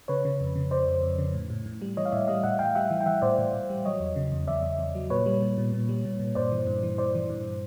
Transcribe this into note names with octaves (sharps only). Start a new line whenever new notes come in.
C#3 B4 C#5
C#3
F2
C#3
C#3 C5 D5
F2
F2
C#3
A2
A2
A2
G3
E3 C#5 D#5
F5
A2 D5 E5
G3 D#5 F5
A2 E5 F#5
A2 F5 G5
G3 E5 F#5
E3
G5
E3 E5 F#5
A2 C5 D5
A2
A2
G3
F#3 C#5 D#5
E2
C#3
E2
E2 D5 E5
E2
E2
F#3
A#2 B4 C#5
G3
A#2
A#2
A#2
G3
A#2
A#2
G2 C5 D5
E3
G2
E3
G2 C5 D5
E3
G2